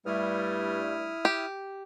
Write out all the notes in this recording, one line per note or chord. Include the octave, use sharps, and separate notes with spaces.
G2 G3 A3 E4 D#6 F6
G4